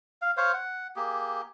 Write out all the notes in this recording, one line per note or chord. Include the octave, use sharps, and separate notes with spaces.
F5
C5 C#5 F5
F#5
A#3 G4 G#4